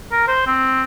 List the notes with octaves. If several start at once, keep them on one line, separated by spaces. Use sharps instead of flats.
A#4
C5
C4